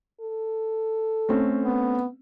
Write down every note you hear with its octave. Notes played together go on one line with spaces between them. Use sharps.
A4
A3 C4 C#4
B3